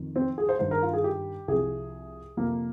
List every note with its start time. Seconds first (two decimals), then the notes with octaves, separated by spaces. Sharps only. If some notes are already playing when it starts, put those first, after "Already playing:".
Already playing: F2 D#3
0.16 C4
0.38 G#4
0.49 C5
0.59 G2 D#3 C5
0.71 A#4
0.82 F4
0.93 G#4
1.04 G4
1.48 C2 C3 F3 G#4
2.37 F2 C3 F3 A#3